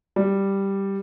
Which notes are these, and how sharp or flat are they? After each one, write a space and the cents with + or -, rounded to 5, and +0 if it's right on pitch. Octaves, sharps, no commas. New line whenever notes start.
G3 +0 D5 +0